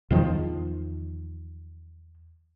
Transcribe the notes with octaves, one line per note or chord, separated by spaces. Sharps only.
E2 D#3 F3